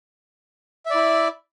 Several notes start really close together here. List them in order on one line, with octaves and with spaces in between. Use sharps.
E5 D5 E4